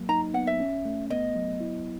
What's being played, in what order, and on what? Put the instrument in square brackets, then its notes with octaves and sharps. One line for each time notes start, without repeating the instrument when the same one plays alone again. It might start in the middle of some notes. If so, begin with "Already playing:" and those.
Already playing: [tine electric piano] F#3 A#3
[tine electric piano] D#4 [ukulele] A#5
[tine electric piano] B3 [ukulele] F#5
[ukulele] E5
[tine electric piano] C#4
A3
[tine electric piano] B3 [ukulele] D#5
[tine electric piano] F#3
E4